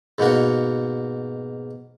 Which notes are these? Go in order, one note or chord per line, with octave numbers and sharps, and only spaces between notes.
G#2 B2 A#3 F#4